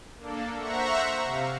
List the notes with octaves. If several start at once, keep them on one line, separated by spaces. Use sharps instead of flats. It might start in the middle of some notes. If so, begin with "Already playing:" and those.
A#3 D4 A4
C5 E5 F#5 A#5 C#6
C3 F5